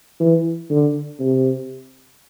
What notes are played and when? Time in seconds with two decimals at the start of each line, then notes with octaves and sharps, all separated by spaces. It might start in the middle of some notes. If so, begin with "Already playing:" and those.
0.20 E3
0.70 D3
1.19 C3